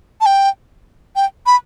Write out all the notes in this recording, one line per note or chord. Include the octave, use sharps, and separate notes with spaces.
A5
G5
G5
B5